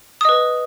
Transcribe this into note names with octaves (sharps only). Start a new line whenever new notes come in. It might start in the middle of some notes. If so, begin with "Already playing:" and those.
B4 D#5 D#6